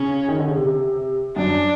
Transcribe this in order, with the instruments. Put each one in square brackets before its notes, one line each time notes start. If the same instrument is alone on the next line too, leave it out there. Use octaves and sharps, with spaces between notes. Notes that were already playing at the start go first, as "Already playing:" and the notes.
Already playing: [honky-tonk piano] C#3 [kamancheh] C#4
[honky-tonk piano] D#3
D3
C#3
C3
[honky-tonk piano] F#2 [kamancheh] D4